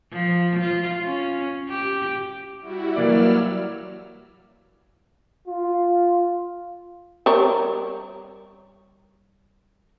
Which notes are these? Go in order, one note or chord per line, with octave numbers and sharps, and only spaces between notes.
F3
F4
C#4
G4
G3 E4 F#4
E3 F#3 A#3 D5 E6 F6
F4
G3 A#4 C#5